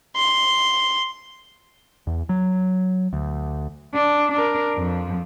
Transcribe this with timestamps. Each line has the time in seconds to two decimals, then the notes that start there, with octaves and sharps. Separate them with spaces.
0.17 C6
2.07 E2
2.29 F#3
3.13 D2
3.94 D4
4.32 D4 A#4
4.76 F2 F3